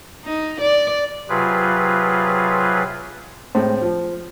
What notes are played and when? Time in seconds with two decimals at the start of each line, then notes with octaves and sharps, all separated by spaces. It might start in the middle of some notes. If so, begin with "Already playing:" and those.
0.25 D#4
0.61 D5
1.29 C3 F#3 F4 G#4 B4
3.55 A2 G#3 C4 C5
3.82 F3